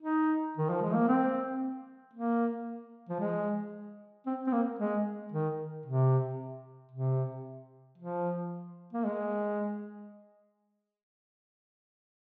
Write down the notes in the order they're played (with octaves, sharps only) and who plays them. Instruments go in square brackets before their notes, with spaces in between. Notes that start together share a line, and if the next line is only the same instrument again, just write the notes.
[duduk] D#4
D#3
F3
G#3
A#3
C4
A#3
F3
G#3
C4
C4
A#3
G#3
D#3
C3
C3
F3
A#3
G#3